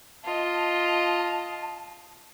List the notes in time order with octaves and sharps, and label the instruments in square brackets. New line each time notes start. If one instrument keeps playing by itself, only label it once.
[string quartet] F4 D#5 [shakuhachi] A5